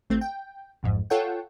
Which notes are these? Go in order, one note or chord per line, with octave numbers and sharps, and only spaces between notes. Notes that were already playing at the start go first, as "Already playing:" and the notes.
A1 A3 C4
G5
A1 F2 G#2
F4 A4 C#5 F#5 G5